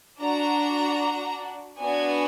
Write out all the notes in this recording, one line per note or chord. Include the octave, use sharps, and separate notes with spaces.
D4 F#4 A#5
B3 D4 F#4 G#5